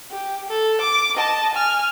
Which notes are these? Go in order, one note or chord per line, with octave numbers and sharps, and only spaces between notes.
G4
A4
D6
D#5 A5
G#5 F6